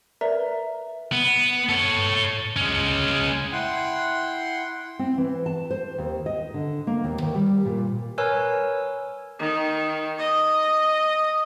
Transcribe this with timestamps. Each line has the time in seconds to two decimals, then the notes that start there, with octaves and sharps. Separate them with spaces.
0.21 A#4 B4 D5 E5 A#5
1.12 B3
1.69 A4 C#5
2.56 G#3 C#4
3.52 E4 F#5 G5 C6
4.99 C4
5.18 E3
5.46 A5
5.71 C5
5.98 D#2
6.26 D#5
6.54 D3
6.87 A#3
7.04 D#2
7.22 D#3
7.35 G3
7.65 A#2
8.18 A#4 B4 C#5 G#5 E6
9.40 D#3
10.19 D#5